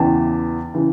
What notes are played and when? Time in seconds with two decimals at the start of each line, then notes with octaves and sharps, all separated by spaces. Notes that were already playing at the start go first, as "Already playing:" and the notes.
Already playing: E2 C#3 E3 G5 A5
0.74 C#3 E3